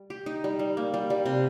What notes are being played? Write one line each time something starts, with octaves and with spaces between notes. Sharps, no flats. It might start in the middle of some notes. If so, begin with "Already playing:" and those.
Already playing: G3
G4
D#4
G3
G3
A#3
G3
G3
C3